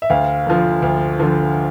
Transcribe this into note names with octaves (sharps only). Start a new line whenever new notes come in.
E5
D2 F5
D3 F3
D2
D3 F3